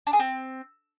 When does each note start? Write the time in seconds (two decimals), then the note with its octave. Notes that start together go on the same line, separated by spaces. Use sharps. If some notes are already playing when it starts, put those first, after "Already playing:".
0.07 D4
0.13 G#4
0.19 C4